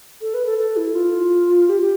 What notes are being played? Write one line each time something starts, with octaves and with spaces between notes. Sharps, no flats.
A4
B4
A4
A4
E4
F4
G4
G4